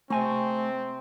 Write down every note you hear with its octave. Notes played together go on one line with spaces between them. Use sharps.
C3 A3 C4 C5 G#5 C#6